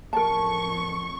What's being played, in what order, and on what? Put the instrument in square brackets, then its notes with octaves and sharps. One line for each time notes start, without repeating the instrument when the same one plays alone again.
[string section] A1 F2 C#6 [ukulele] A#4 A5